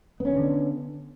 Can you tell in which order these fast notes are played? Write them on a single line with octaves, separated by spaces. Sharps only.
B3 C#4 D#3 D3